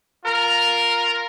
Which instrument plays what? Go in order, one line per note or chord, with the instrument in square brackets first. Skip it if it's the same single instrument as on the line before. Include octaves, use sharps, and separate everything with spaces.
[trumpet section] F4 A#4